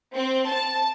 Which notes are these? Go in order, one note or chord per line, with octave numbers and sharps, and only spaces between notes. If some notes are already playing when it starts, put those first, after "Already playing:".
C4
A5